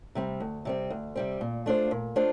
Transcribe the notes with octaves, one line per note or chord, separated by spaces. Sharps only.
C3 G3 C4
D2
C3 G3 C4
D2
C3 G3 C4
A#2
A3 D4 F4 C5
A#2
A3 D4 F4 C5